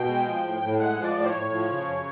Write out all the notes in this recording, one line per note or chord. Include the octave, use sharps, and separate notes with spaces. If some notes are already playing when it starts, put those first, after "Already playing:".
Already playing: B2 G5
G#3
F3
A2
A2
G#3 F#5
F3
D5
A2
C5
C#5
A2
F3
C#3
F#2